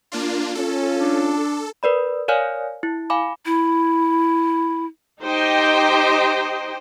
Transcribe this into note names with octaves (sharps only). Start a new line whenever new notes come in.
A#3 D4 F4
C#4 F4 A4
D4
A#4 B4 D5 B5
A#4 C#5 D5 F5 G#5 F6
E4
F5 G#5 B5 D6
E4
D#4 G4 C5 D#5 G5